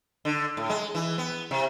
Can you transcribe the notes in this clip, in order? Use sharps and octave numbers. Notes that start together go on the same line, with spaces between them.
D3
A2
G#3
E3
B3
C3